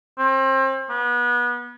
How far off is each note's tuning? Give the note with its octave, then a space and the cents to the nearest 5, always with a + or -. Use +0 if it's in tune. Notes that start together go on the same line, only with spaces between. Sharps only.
C4 +35
B3 -30